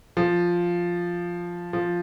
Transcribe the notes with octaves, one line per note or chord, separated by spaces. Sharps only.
F3
F3